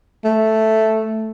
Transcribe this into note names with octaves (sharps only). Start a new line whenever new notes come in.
A3